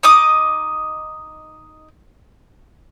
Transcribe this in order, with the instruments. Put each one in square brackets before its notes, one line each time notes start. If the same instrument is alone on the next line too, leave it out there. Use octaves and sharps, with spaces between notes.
[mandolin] D#4 D#5 D6 D#6